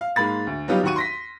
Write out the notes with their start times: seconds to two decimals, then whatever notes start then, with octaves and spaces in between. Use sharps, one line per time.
0.01 F5
0.16 G#2 G#3 A#3 B5 A6
0.47 D2
0.68 F#3 G3 B3 D#4 F4 G4
0.83 D#2 D#3 F#4 C#6 D#7
0.96 C6 A#6 B6